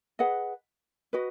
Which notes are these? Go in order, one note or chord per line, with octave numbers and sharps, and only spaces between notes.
G#4 B4 D#5 F#5
F#4 B4 D#5